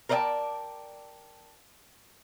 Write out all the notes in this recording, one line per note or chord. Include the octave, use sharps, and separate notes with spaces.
A#4 C5 D5 D#5 G5 A5